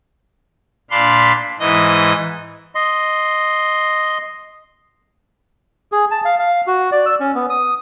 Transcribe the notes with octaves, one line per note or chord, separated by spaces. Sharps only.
A#2 D4 F5 B5 C6
G#2 E3 D#5
D#5 C6
G#4
A5
F5
F5
F#4
D5
E6
C#4
B3
D#6